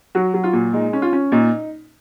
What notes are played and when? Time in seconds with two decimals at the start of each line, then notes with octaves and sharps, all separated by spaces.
0.15 F#3 F#4
0.34 F#3
0.44 F4
0.53 A#2
0.73 G#3 D#4
0.93 C#4
1.02 F4
1.13 C#4
1.32 A#2 D#4